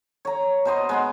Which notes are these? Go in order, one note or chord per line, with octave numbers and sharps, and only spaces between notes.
C#5 A#5
B2 C5 D#5 C6
G#3 B3 C6